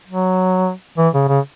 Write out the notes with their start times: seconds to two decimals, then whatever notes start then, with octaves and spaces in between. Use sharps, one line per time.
0.08 F#3
0.98 E3
1.14 C#3
1.29 C#3